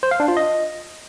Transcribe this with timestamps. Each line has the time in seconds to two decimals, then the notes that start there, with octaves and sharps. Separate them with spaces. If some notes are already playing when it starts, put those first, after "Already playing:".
0.03 C5
0.11 F5
0.20 D4
0.28 F4
0.37 D#5